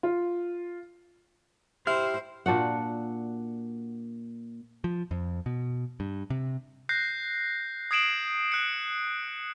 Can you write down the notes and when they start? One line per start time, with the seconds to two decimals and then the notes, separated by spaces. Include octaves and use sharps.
0.03 F4
1.87 E4 G4 C5 F6
2.46 A#2 D4 F#4 F#5
4.84 F3
5.11 F2
5.46 B2
6.00 G2
6.30 C3
6.89 F#6 G6 A#6 C7
7.91 D#6 G#6 C7 D7 E7 F#7
8.52 F#6 C#7